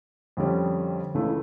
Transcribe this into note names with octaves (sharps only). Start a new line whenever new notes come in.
F2 D3 G3 C#4
C#2 C#3 E3 A3 E4